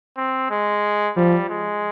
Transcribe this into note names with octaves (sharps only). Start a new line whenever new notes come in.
C4
G#3
F3 G3
G#3